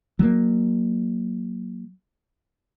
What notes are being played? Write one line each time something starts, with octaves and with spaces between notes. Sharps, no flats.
F#3 A#3